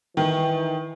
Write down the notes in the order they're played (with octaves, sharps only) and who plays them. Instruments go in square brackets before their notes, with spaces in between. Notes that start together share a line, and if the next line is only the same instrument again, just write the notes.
[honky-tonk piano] D#3 [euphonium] E3